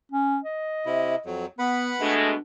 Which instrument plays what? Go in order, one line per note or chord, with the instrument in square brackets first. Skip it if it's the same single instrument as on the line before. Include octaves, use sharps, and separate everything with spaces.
[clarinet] C#4
D#5
[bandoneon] C3 E4
F2 F#3
[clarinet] B3 [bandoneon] B4 F#5 B5
[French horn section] B2 G#3 A3 [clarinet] D4